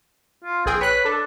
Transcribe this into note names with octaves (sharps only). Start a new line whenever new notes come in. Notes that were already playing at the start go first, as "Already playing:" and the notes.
F4
A#1 C4 G#4 G5
B4 C#5 F#6
D4 A4